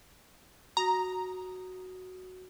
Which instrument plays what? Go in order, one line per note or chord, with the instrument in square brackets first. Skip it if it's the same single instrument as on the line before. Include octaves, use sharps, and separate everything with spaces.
[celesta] F#4 D#6 [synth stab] A#5